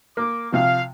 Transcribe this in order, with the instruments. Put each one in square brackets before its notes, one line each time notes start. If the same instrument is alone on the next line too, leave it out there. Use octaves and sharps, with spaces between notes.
[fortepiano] A#3 [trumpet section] D6
[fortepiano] C3 F3 [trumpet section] F5